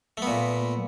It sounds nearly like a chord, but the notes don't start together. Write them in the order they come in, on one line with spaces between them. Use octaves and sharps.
A3 B3 A#2